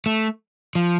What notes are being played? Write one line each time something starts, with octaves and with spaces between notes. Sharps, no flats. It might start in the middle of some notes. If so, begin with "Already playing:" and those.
A3
F3